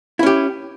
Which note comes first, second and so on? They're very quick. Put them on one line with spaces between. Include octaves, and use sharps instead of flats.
E4 C#4 G4